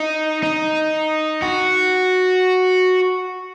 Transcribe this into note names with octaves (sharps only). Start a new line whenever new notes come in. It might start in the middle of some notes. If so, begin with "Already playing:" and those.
Already playing: D#4
D#4
F#4